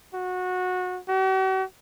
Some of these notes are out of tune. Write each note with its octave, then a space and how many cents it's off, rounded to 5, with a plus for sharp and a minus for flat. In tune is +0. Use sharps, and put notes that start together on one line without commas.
F#4 -20
F#4 +45